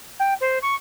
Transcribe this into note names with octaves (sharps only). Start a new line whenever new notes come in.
G5
C5
C#6